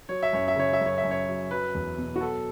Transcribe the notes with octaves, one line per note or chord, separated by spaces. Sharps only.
F#3 C#5
E5
F#2 C#5
E5
C#3 C#5
E5
F#2
C#5
E5
F#2
C#5
F#3
F#3 B4
E2
B2
F#4
F#3 A4